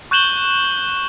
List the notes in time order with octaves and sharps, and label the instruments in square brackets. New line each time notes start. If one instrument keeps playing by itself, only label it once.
[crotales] C#6 F#6 G6 E7 F#7 G7